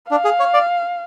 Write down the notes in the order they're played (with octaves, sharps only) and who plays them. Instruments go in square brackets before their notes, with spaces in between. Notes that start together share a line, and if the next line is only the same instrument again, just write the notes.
[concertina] D4 [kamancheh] F5
[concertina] G#4
C#5
D5